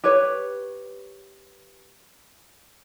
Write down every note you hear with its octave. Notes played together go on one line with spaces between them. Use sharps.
G4 B4 C#5